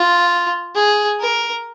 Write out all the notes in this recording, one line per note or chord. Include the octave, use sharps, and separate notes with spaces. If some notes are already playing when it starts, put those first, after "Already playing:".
Already playing: F4
G#4
A#4